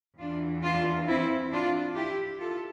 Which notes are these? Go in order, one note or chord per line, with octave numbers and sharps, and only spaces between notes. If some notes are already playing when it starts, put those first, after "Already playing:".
E2 E3 D4 F4
D4 F4
C4 E4
D4 F4
E4 G4
F4 A4